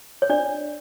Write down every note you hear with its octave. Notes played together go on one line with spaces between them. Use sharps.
C#5
D4 D5